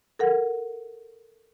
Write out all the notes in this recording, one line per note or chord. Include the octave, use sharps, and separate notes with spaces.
A4 A#4 F#5